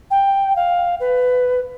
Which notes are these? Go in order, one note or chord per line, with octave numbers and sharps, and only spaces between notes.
G5
F5
B4